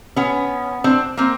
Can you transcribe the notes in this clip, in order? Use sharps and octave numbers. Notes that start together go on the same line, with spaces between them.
B3 C#4
C4 D4
A#3 C4